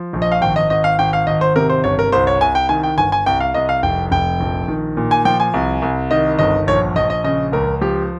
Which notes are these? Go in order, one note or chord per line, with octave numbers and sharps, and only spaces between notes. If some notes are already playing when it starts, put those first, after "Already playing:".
Already playing: F3
A#1
D#5
F5
G#1 G5
D#5
G#1 D#5
F5
G#1 G5
F5
G#1 D#5
C5
C3 A#4
C5
G1 C#5
A#4
C2 C5
C#5
C2 G#5
G5
D#3 G#5
G5
G1 G#5
G#5
C2 G5
F5
C2 D#5
F5
F1 G5
F1 G5
A#1
D#3
A#2
G#5
F3 G5
G#5
C2
C2
D#3 D#5
G1 D#5
A#1 C#5
A#1 D#5
D#5
C#3 D#5
C#2 A#4
F3 G4